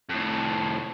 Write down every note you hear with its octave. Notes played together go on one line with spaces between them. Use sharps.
F2 A2